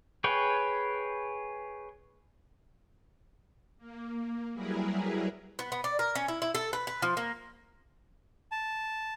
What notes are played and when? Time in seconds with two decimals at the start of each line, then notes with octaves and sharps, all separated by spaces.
0.24 G#4 B4 C#5 G5
3.78 A#3
4.53 F#3 G3 E4 G#4 A#4 B4
5.59 B3
5.72 B3
5.84 D5
5.99 A#4
6.16 C#4
6.28 E4
6.42 E4
6.55 A4
6.73 B4
6.87 B4
7.02 F3
7.17 A#3
8.52 A5